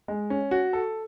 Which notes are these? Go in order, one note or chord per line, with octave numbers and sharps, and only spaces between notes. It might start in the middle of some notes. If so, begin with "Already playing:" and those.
G#3
C#4
F#4
A4